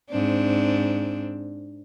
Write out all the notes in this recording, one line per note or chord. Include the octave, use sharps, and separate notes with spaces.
G#2 C4 D4